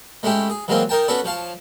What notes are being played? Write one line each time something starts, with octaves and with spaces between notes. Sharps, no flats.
G#3 A3 C#4 E4 G4
G#4
E3 F#3 G#3 A#3 C4 F4
D#4 A#4 G5 A5
B3 C#4 F#4 A4 B4 D5
F3 C#5 F5 A5